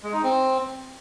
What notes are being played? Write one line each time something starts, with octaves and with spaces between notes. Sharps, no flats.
G#3
D#4
C4